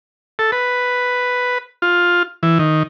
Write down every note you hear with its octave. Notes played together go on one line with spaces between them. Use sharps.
A4
B4
F4
E3
D#3